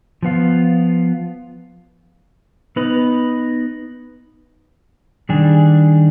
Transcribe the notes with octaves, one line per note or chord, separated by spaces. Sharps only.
F3 B3 F4
B3 D#4 B4
D#3 G3 D4 G#4